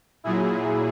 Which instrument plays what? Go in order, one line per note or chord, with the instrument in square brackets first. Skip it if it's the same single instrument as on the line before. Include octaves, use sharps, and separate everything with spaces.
[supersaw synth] A#2 F#3 E4 G#4